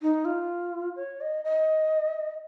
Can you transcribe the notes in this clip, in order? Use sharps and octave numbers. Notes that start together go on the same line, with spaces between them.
D#4
F4
C#5
D#5
D#5